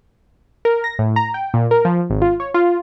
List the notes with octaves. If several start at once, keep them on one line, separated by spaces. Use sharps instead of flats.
A#4
A#6
A2
A#5
G5
A#2
A#4
F3
G#1
F4
C#5
F4